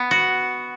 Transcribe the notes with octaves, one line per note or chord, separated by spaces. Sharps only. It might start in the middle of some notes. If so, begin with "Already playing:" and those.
Already playing: B3
F#4